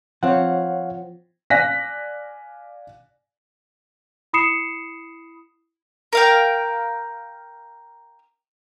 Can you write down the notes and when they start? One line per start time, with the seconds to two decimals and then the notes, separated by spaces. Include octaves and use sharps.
0.23 F3 C4 C#5 F5 F#5
1.50 D5 F5 G#5 F#6 A#6 B6
4.33 E4 B5 D#6 C7 C#7 E7
6.13 A#4 F5 G5